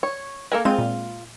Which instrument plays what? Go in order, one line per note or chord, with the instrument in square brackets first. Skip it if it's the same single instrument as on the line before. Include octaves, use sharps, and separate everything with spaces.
[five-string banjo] C#5
[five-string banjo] A#3 A4 G#5 [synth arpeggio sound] A#4
[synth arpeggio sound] G#3 C4 D#7 [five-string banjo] F4
[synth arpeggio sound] A#2